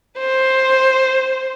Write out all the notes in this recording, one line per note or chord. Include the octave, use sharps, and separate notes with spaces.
C5